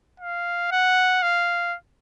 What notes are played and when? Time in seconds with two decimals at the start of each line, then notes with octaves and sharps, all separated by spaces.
0.20 F5
0.72 F#5
1.22 F5